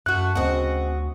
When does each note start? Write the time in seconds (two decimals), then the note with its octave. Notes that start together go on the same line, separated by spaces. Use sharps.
0.06 F#2 A3 F#4 F#6
0.35 D2 C#3 C4 F#4 D#5